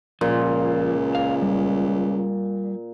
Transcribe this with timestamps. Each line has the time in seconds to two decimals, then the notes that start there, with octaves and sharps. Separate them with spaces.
0.21 C#2 A#2 F3
1.15 F5
1.42 G3